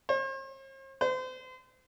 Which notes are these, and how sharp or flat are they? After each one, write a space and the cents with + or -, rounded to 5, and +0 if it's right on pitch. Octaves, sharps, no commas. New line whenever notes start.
C5 +45
C5 -35